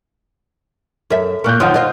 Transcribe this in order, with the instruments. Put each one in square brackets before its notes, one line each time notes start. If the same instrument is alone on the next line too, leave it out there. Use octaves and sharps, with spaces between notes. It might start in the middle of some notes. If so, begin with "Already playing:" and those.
[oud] F#2 E5 [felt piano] A4 A#4
[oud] A#2 A#3 [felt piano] C#6 F#6 G6
[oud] F#2 D#3 F3 [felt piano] F#5 D#6
[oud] F4 C5 D#5